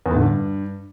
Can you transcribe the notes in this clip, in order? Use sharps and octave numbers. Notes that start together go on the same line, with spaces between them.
E2
A2
D3
G2